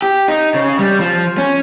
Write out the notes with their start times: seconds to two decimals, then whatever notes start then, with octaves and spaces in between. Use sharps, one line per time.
0.02 G4
0.28 D#4
0.55 C#3
0.79 G3
1.00 F3
1.38 C#4